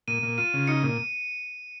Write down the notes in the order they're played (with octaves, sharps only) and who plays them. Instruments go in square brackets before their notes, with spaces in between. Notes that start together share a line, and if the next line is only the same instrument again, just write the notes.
[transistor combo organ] A#2 [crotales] D#7
[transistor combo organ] A#2
[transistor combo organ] F4 [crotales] D#7
[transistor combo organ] C#3
[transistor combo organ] D#4 [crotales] C#7
[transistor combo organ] A#2